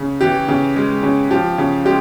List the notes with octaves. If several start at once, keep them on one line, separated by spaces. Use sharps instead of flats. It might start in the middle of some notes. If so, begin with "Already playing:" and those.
Already playing: C#3
E3 G4
C#3
G#3
C#3
F3 G4
C#3
G#3 G4